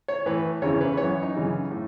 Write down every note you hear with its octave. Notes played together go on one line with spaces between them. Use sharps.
C#5
A2 E3 B4
E2 C#3 E3 C#5
B4
E3 C#5
F#2
D#4
F#2 C#3 E3
A2